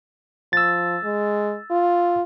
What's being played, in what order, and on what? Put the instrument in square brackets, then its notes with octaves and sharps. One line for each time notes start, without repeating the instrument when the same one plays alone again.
[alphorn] F3 [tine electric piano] E6 A6
[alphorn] G#3
F4